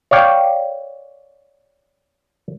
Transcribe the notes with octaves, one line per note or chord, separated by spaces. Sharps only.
C#5 D5 F5 G5